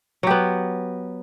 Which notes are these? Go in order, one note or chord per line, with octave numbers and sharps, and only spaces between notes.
F#3 B3 G4